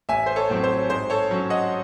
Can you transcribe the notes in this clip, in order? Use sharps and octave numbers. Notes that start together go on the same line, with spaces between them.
A1 E5 G#5
C5
A4 C#5
A2 F#3 C4
C5
G#2 C5
A4 C#5
F#3 C#4
D#5 F#5